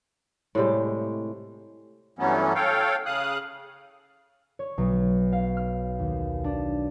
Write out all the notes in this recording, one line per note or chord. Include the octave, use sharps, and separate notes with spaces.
A2 C3 G3 G#3
G2 E3 F#3 A3 B3 C#4
A4 C#5 F5 G5
C#3 F5 D#6 F#6
C#5
B1
F5
F6
D#2
D4